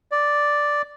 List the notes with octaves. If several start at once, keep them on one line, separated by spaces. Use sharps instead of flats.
D5